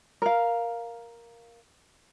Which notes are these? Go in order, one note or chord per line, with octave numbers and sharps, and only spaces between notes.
A#4 F5